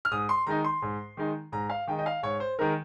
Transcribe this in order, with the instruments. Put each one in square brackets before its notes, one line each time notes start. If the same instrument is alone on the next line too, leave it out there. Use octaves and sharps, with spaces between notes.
[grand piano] F6
G#2 D#6
C6
D#3 G#3 D#4 A#5
C6
G#2
D#3 G#3 D#4
G#2 A#5
F5
D#3 G#3 D#4 G5
D#5
F5
G#2 C#5
C5
D#3 G#3 D#4 A#4